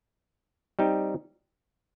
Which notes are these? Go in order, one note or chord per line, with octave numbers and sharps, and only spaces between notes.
G3 C4 D#4 G4